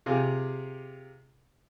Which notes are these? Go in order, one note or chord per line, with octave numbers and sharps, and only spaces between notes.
C3 F4 G4 G#4